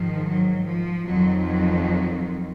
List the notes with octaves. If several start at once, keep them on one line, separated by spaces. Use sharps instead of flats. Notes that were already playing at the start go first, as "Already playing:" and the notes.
Already playing: G#2 D#3 F3
F#3
F3
F2 D#3 F#3
F#3